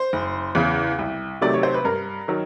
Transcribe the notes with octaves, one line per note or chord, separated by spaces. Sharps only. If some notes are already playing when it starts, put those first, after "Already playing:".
Already playing: C5
F#1
E2 C#3 E3
C2
C3 D#3 F#3 A3 D5
C#5
C5
B4
G2 A#4
D#3 F#3